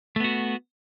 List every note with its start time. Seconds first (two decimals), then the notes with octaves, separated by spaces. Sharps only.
0.16 A3
0.20 B3
0.24 F#4